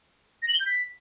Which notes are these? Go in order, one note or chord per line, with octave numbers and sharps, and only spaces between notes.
A#6
F#7
G7
G6
B6